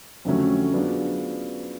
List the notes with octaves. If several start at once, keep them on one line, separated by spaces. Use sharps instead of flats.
F2 D3 F#3 A3 C#4
F#3 B3 D4 F4 G#4